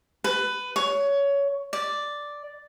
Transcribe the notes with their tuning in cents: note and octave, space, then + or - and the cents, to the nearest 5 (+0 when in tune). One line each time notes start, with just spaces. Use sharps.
B4 +15
C#5 +20
D5 +0